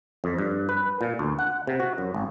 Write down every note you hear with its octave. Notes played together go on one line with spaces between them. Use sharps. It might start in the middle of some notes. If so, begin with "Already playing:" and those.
F2
G2
B4
A#2
D2
F#5
C3
F#4
F#2
G#1